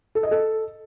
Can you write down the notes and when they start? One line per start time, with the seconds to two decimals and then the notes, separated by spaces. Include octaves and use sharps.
0.15 A4
0.23 D#5
0.31 A4